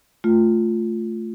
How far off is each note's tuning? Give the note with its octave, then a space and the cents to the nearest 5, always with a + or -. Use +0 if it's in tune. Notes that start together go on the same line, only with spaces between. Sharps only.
A3 +0 F4 +0